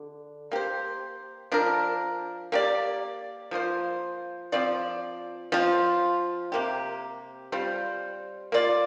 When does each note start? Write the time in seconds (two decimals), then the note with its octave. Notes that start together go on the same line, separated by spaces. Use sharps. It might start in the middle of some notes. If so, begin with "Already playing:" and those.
Already playing: D3
0.52 A#3 G4 C5
1.52 F3 D4 A#4
2.52 A#3 G4 D5
3.51 F3 A#3 F4 C5
4.52 F3 C4 F4 D5
5.52 F3 C4 F4
6.52 C3 A#3 G4
7.52 G3 C4 F4 C5
8.52 A#3 F4 D5